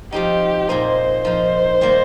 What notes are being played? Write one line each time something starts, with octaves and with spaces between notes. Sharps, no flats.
F3 C4 D#4 G4
A#2 A#3 D#4 C5
F3 D#4 C5
D#3 G3 A#3